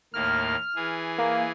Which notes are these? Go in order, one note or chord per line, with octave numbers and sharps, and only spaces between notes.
D#2 A2 A#3 F6
E3 G#4
A#3